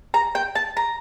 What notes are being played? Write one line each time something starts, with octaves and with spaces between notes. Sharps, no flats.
A#5
G5
A5
A#5